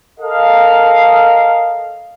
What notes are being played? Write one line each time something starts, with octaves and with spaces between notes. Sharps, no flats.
A4 A#4 D#5 F5